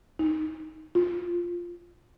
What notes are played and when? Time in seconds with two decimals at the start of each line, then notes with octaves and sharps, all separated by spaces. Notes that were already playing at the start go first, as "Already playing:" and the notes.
0.19 D#4
0.95 F4